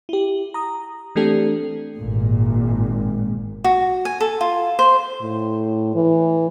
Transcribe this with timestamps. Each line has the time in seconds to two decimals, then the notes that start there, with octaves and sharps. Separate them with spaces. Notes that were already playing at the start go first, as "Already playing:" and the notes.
0.09 E4 G4
0.54 A#5 D#6
1.15 E3 A3 C4 D4 G4 A4
1.97 G#1 A#2
3.64 F#4
4.05 G#5
4.21 A4
4.41 F4
4.79 C5
5.21 A2
5.95 E3